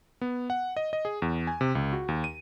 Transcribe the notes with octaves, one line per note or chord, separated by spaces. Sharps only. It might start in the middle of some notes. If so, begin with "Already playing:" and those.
B3
F#5
D#5
D#5
G#4
E2
G#5
C3
C#2
F#4
D#2
D#7